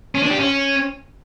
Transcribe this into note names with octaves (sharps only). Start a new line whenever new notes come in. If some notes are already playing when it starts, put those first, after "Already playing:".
C#4
D4
G4
C#4